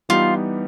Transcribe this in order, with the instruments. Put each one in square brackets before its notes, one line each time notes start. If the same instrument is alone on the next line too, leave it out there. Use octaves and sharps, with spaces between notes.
[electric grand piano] E3 G3 B3 D#4 G4 [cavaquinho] F4